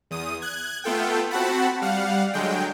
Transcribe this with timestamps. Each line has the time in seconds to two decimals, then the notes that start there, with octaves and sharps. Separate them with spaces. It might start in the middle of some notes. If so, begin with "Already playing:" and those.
0.11 E2 D#6
0.42 F#6 G#6
0.84 A3 B3 F4 A4 G5
1.31 C4 F#4 F#5 A5 B5
1.82 G3 F5 F#5
2.34 D3 F#3 G#3 G5